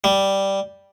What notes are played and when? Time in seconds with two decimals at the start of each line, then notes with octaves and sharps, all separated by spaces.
0.04 G3